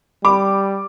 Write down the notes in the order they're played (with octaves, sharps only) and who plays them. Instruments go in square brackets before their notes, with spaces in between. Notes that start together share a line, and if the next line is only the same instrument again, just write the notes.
[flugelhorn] G3 [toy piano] B5 [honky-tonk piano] D6